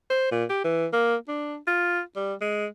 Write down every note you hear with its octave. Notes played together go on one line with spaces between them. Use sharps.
C5
A#2
G4
E3
A#3
D4
F4
G3
G#3